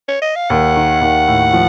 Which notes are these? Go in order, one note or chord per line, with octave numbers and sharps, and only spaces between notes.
C#5
D#5
F5
D#2 F#5
D#3
D#2
A2
F3